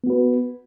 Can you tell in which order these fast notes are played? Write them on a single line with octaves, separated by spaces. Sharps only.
B3 F#4 B4